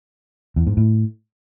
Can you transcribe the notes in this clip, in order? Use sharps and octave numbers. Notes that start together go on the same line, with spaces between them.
E2
G#2
A2